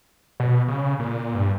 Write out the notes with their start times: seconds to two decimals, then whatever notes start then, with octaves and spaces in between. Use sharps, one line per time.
0.40 B2
0.68 C#3
0.99 A#2
1.34 G2